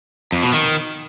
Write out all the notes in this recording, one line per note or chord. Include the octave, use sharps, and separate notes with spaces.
F2
B2
D#3